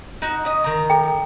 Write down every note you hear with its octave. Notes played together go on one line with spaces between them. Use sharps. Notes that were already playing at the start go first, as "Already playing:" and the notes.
D#4 F#4
C#4 D#5
D#3 A#5
A4 G5